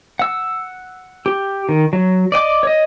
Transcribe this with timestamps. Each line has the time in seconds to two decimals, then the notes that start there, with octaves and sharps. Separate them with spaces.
0.19 F#5 E6
1.26 G4
1.69 D#3
1.93 F#3
2.32 D5 D#5 F#5 D6
2.63 C#5 D#5